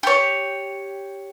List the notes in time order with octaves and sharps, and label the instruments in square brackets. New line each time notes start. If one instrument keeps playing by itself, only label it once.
[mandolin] G4 C#5